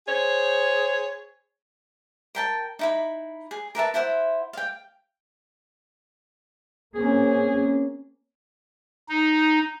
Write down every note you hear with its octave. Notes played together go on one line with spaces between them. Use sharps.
G#4 C5 C#5
A#4 G5 A5
D#4 E4 B5
G#4
A#4 B4 E5 A5
E4 C5 E5 F#5
F5 G5
A#3 C4 C#4 G#4
D#4